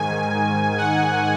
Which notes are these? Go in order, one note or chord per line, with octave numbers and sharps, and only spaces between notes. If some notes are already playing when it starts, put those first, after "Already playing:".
Already playing: G#2 D#3 G#5
F#5